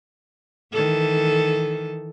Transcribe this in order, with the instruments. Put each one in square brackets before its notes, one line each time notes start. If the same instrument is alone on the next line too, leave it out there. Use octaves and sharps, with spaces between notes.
[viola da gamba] D#3 E3 A4